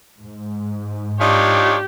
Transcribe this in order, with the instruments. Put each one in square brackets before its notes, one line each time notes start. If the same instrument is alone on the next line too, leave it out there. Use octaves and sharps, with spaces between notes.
[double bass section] G#2
[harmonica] D4 F4 C#5 [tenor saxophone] D#4 [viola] G4